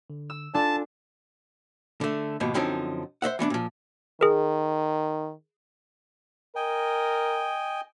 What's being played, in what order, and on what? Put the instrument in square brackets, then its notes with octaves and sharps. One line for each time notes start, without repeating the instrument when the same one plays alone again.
[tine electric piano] D3
[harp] E6
[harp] D4 [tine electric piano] F4 A4 G#5 [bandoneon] A5
[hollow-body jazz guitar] D3 A3
D#2 G#2 B2 F3
F#2 D3 F3 C4 C#4 D#4
C5 D#5 E5 F#5
E3 B3 C#4 D4
A#2 F3
[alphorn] D#3 [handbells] G#4 A#4
[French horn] A#4 [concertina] D#5 G5 G#5